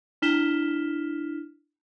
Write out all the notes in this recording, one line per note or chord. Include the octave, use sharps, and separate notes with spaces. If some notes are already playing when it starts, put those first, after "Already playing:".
D4 E4 F6 B6 E7 G7